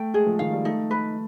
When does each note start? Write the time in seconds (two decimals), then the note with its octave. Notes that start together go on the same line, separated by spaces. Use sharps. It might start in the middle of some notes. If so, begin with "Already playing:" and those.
Already playing: A3 G5
0.14 G#3 G#4
0.26 F3
0.39 D#3 F5
0.52 G3
0.65 A3 D#4
0.91 B4